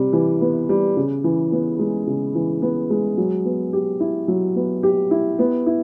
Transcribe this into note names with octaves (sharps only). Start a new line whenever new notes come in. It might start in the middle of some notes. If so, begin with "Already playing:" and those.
Already playing: C3 G3
E3
B3
G3
C#3
E3
B3
G#3
C#3
E3
B3
G#3
F#3
B3
G4
E4
F#3
B3
G4
E4
B3
E4